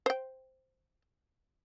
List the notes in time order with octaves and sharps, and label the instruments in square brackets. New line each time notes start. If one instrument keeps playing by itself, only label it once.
[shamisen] C5 G5